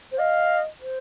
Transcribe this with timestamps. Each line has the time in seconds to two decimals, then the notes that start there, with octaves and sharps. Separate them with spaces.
0.12 C5
0.20 D#5 F5
0.80 C5